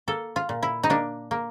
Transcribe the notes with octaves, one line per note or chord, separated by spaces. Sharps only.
A#3 A4
F4
A#2
E4
D#4
A#3 D4
A#3